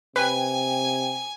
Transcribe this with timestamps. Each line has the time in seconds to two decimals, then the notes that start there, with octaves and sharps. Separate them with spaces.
0.16 C3 B4 G5 G#5